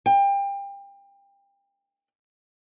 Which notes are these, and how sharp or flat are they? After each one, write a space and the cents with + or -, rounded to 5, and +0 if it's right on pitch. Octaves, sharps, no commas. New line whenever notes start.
G5 +30